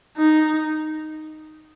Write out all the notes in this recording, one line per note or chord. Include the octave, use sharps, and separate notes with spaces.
D#4